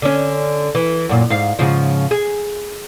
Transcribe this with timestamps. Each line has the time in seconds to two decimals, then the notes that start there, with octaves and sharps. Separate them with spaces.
0.02 D3 C#4
0.75 E3
1.09 F#2 A#2
1.30 G#2 F5
1.59 G#2 C#3 F3
2.11 G#4